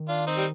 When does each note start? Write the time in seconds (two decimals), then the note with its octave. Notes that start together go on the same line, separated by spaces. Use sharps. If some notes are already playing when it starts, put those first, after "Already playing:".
Already playing: D#3
0.09 D4 F4
0.27 C4 D#4
0.37 G3